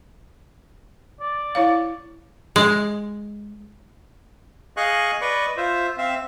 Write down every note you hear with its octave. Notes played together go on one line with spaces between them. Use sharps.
D5
E4 C#5 F5
G#3
G#4 D#5 F5 G#5 C#6 F#6
B4 D5 D#5 C#6
F4 C5 E5
C4 E5 F5